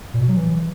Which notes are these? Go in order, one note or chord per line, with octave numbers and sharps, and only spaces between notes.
A#2
B2
F#3
E3